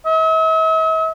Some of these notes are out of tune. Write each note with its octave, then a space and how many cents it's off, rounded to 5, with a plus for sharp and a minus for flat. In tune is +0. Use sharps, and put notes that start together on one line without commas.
E5 -45